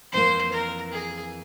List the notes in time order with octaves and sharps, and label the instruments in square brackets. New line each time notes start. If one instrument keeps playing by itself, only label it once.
[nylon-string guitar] F2 E3 A#3 [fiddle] C5
[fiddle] A#4
G#4